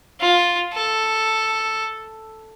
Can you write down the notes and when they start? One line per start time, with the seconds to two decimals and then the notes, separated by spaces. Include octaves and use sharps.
0.21 F4
0.74 A4